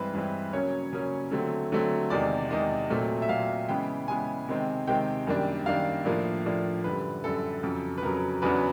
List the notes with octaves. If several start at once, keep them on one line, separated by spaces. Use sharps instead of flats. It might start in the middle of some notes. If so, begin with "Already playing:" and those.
Already playing: G2 E3 G#3 C4 B4
G2 E3 G#3 C4
C#3 F#3 A#3 C#4 C#5
C#3 F#3 A#3 C#4
D3 F#3 A3 C4
D3 F#3 A3 C4
E2 C3 D#3 G#3 D5
E2 C3 D#3 G#3 D#5
A#2 F#3 A3 C4
E5
A#2 F#3 A3 C4 F5
C#3 E3 G#3 B3 G5
C#3 E3 G#3 B3 G#5
C3 D#3 G#3 C4
C3 D#3 G#3 C4 G5
F#2 D#3 G3 A#3 D4
F#2 D#3 G3 A#3 D4 F5
A2 F3 A#3 D4
A2 F3 A#3 D4
F#2 D3 G3 B4
F#2 D3 G3 A4
F2 C#3 F#3
B4
F2 C#3 F#3 A#4
E2 C#3 F#3 B3 D4 B4